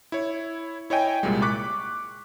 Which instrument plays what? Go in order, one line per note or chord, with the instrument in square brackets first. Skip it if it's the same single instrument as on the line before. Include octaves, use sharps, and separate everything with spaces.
[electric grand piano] E4 C#5
E4 C#5 D#5 G5 G#5
C2 A#2 G3 G#3
C#6 D6 F#6 B6